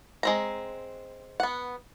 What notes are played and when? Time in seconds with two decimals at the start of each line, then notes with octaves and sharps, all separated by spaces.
0.23 G#3 C4 A#5
1.40 B3 F#5